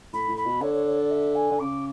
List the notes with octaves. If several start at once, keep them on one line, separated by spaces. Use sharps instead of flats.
A2 B5
A2
B5
B2
D3 C#5
C#5
C#5
D5
E5
G#5
D3
C#3 D6